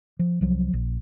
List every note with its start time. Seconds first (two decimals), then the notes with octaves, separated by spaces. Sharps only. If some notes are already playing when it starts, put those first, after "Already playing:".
0.19 F3
0.41 C2 F3 F#3
0.73 A#1